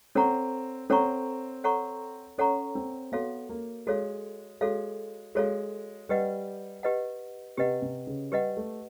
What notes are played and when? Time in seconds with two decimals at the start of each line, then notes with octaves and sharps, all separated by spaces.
0.15 C4 A4 C#5 F#5 A#5 C#6
0.90 C4 A4 C#5 F#5 A#5 C#6
1.64 A4 C#5 F#5 A#5 C#6
2.38 C#4 A4 C#5 F#5 A#5 C#6
2.75 C4
3.12 B3 F#4 A4 C#5 F5
3.49 A#3
3.87 G#3 F#4 A4 C#5 F5
4.61 G#3 F#4 A4 C#5 F5
5.35 G#3 F#4 A4 C#5 F5
6.09 G3 G4 B4 D#5 F#5
6.83 G4 B4 D#5 F#5
7.58 C3 G4 B4 D#5 F#5
7.82 C3
8.07 C#3
8.32 G3 G4 B4 D#5 F#5
8.57 A3